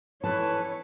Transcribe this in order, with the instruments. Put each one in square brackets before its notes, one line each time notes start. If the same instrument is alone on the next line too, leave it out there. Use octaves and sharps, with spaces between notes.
[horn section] E3 A4 B4 [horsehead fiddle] C#5 [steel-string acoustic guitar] A5